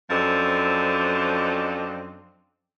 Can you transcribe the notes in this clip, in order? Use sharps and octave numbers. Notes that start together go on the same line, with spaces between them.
F#2 F3 C4 D4 A4 D#5